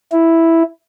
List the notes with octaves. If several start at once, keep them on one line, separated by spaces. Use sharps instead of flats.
E4